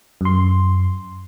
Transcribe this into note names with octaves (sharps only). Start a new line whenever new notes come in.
F#2 C6